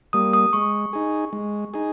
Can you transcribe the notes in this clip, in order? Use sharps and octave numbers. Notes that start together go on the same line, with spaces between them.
G3 A#3 D#6
D#6
G#3 C#6
D#4 G#4
G#3
D#4 G#4